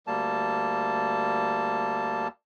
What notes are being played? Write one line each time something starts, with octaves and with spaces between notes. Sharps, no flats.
D2 G3 A#3 A5